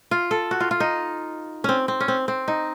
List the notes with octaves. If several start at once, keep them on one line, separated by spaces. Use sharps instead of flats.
F4
A4
F#4
F4
F4
D#4
C4 C#4
C4
C#4
C4
C4
D#4